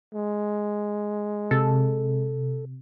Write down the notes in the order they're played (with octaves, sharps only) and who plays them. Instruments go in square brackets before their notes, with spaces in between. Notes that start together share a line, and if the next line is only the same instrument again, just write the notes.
[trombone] G#3
[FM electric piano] C3 [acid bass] A4